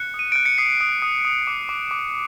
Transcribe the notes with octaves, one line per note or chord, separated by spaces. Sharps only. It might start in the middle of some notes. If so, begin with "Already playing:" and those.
Already playing: F#6 C#7
D#6
D#7
F#6 D7
C#7
D#6 C7
D#6
D#6
D#6
D6
D6
D6